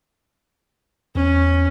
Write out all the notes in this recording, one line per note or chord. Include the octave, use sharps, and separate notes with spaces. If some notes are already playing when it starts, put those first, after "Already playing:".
E2 C#4